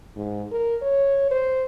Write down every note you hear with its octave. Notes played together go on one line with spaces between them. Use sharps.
G#2
A#4
C#5
C5